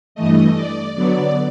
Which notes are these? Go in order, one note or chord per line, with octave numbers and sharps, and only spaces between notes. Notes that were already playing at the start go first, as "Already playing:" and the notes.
G2 E3 A3 D#5
D5
D3 F#3 B3 D5